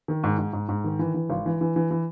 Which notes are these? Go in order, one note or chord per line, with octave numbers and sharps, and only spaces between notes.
D#3
G#2
G#2
G#2
G#2
D#3
E3
E3
G#1
E3
E3
E3
E3